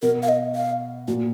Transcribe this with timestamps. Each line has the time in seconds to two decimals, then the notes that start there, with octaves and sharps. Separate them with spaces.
0.02 B2 A#4
0.23 F5
0.29 D#5
0.55 F5
1.08 A#2 F#4